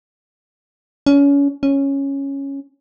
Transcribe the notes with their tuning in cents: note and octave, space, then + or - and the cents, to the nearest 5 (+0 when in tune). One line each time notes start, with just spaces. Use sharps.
C#4 +30
C#4 -5